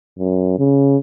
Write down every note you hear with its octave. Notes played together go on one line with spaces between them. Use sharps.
F#2
C#3